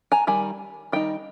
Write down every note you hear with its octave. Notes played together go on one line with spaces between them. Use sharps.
G#5 A#5
D#3 G3 G#5
D#3 G3 D#4 G5